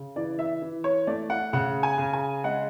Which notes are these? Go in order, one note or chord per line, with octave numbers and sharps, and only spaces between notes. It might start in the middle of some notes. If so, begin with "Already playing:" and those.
Already playing: C#3
E3 D5
E5
E3
C#5
A3 D5
F#5
C#3 F#5
G#5
C#3
G#5
G#3 F#5